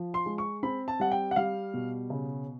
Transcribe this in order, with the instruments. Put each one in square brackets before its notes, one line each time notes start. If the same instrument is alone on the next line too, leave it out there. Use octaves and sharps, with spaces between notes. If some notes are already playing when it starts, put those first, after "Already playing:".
Already playing: [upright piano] F3
C6
G#3
C#6
C4 B5
A5
G3 F#5
G5
F#5
G3 F5
B2
C#3